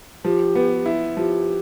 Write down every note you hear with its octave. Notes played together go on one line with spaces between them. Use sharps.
F3 G4
B3
E4
F3 G4